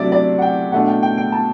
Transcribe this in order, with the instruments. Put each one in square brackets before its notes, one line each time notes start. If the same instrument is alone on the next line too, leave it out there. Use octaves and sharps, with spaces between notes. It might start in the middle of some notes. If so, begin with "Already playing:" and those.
Already playing: [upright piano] C3 F#3 A3 D4 D5 E5
D5
F#5
G5
B2 A3 D4 F#5
G5
G5
G5
A5